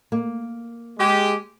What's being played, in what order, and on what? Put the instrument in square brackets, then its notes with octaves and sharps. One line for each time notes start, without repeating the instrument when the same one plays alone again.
[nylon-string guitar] A#3
[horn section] G#3 G4